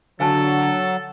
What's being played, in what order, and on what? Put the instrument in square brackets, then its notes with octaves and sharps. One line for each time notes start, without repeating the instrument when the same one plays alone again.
[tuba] D3 [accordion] F#3 [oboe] A4 [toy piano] F5 G#5 A5